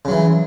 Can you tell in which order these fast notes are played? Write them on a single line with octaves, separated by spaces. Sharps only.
C#3 F#3 E3